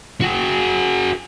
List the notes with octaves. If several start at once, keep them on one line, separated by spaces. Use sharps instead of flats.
F#4 G#4